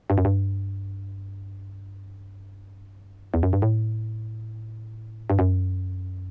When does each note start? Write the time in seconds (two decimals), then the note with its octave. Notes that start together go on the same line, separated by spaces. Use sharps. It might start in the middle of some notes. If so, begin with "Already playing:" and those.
0.10 G2
0.18 F#2
0.25 G2
3.34 E2
3.43 F#2
3.53 G2
3.62 A2
5.30 G2
5.39 F#2